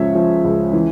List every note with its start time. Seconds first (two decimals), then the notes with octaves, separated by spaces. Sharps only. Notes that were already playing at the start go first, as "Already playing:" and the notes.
Already playing: C#2 C#3 F3 G#3 C#5 E5
0.15 F3
0.44 C#2
0.73 E3